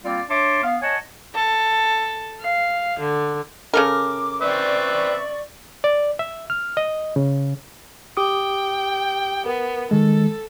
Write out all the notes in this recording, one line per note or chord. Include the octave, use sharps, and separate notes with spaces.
G3 A#3 C4 F4 D5 F5
D4 C#5 E5 A5 C6 D6
B3 F5
C#5 D#5 F#5 G#5 A5
A4
F5
D3
C#3 A4 A#4 D6
C4 B4 D5 E5 C#6
D5
E5
F6
D#5
C#3
G4 G5 D6 D#6
B3 A#4
D#3 G#3 A4